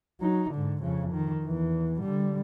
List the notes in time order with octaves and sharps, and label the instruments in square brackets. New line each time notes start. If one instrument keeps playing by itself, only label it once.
[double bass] F#3 D#4
G#2 D3
F2 C#3
D#3
E2 E3
D3 G3